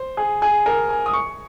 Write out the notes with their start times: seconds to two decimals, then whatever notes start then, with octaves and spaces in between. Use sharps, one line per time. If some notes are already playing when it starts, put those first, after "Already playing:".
Already playing: C5
0.17 G#4
0.42 G#4
0.66 A#4
0.89 G#5
1.06 D#6
1.14 C#6